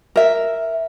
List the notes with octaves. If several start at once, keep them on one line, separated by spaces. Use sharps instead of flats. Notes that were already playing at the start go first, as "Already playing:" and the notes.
A#4 E5